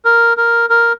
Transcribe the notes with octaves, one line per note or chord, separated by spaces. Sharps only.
A#4
A#4
A#4